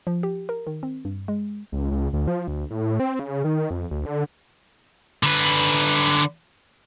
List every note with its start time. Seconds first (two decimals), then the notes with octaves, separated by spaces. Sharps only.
0.07 F3
0.23 G4
0.49 A#4
0.67 D#3
0.83 C4
1.05 G2
1.28 G#3
1.72 C#2
1.91 C#2
2.13 D2
2.28 F3
2.48 D2
2.70 A2
3.00 C4
3.19 C#3
3.44 D#3
3.70 F2
3.91 D2
4.06 D3
5.23 D3 B4